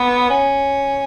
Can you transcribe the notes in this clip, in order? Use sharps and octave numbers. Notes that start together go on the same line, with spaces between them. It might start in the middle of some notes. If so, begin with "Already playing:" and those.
Already playing: B3
C#4